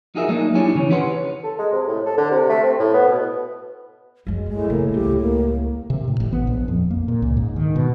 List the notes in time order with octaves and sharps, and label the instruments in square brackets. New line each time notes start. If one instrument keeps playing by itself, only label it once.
[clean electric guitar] D#4 F4 F#4 G#4 A#4 E5
F#3 G#3 A#3 D4 D#4
D4 E4 G4 C#5 G#5
C#3 E3 C#4
G4 B4 C#5 F#5 C6
[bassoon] A4
G#3
C3
A2
A4
D3
C3
A3
C4
A2
B3
B2
[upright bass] F#2 F#3 [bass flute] G#3
[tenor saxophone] A2 [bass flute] G#3
[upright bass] C#3 [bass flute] A#3
[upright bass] C#2 G3 [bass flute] G4
[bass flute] A#3
[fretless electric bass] C3
A2
A1
B3
A#1
F2
A#3
A#2
C#2
G#2
D#3
B2